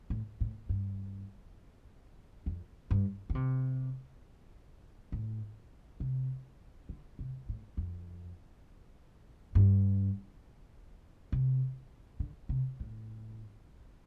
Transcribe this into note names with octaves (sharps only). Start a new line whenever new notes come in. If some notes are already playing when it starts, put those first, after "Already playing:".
A2
A2
G2
F2
G2
D3
C3
A2
C3
D3
C3
A2
F2
G2
C3
D3
C3
A2